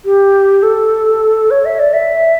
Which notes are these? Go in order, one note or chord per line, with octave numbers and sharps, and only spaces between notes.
G4
A4
C#5
E5
D5
E5